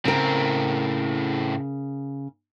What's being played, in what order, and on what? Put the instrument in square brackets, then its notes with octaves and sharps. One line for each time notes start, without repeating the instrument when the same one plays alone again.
[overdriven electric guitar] A2 C4 [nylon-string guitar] C#3 A#4